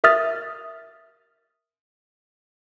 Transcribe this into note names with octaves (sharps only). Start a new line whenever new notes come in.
A#4 E5 D#6 F6 A6